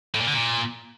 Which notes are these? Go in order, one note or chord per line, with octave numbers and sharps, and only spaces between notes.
A2
A#2
D3
A#2